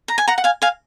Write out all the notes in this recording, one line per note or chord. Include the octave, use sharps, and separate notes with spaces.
A#5
G#5
F#5 A#5
F#5
F5 G#5
F5 G#5